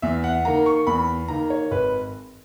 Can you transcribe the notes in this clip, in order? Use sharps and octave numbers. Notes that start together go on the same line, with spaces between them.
E2 E5
F#5
D#3 A#3 A#5
C#6
E2 B5
D#3 A#3 A#5
C#5
G#1 B4